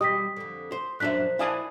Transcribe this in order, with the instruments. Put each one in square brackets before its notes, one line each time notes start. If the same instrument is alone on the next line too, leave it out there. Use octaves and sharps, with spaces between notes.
[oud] E2 B2 G3 [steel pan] G4 D#5 [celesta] D#6 B6
[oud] F2 D3
[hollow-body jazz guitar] C5
[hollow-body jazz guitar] F#2 D4 E5 [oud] A#2 F3 [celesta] F#6 B6
[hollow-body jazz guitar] E4 D5 A5 [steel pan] F5 G#5 D#6